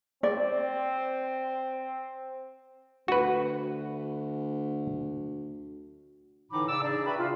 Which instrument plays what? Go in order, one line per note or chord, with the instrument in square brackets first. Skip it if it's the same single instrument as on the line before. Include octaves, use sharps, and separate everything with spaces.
[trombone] C4 [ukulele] D5
[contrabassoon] D2 [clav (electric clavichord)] F#4 B4
[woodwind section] A2 D3 E3 D#4 B5 D6
C#3 D5 D6 E6
D4 D#4 G#4 D5
D4 F#4 B4 E5 G5 B5
C#3 F4